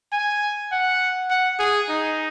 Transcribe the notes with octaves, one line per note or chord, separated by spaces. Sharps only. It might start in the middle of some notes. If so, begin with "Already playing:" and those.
G#5
F#5
F#5
G#4
D#4